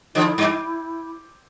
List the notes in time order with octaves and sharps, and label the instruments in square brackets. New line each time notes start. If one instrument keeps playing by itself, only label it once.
[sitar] D3 F3 [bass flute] E4
[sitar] G2